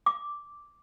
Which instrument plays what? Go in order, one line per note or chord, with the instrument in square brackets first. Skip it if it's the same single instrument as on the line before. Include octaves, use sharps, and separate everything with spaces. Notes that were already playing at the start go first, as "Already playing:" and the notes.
[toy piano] D6